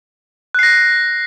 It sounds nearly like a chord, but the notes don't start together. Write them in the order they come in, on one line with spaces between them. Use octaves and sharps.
F#6 C7 A#6